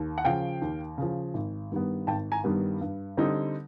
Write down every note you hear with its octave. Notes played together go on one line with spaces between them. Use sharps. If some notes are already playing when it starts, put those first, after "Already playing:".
Already playing: D#2
F#5
C#3 F3 F5 G5
D#2
C#3 F3
G#1
G2 D#3 G3 B3
G#1 G5 A5
G#5 A#5
G2 D#3 G3 B3
G2
D3 G3 C4 D#4